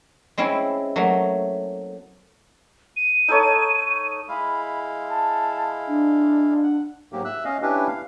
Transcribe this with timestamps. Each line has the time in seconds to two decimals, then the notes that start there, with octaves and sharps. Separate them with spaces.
0.38 G#3 C4 C#4 E4
0.96 F#3 A3 A#3
2.97 D#7
3.28 D#4 A4 C#5
4.29 G#3 E4 F5 B5
5.10 A5
5.87 D4
6.64 F#5
7.13 G#2 F#3 A#3 G4
7.25 E5 E6 F#6
7.45 C#4 D#5 F5
7.62 C#4 D4 E4 G4 B4
7.87 F5